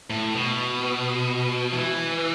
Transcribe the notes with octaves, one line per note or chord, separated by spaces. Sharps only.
A2
B2
E3